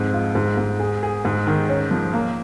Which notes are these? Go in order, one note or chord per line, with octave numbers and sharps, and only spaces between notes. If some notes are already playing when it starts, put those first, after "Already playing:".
Already playing: F2 G#2
F4
G#2
G#2
G#4
G#4
G#2
D#3
C#4
F3
A#3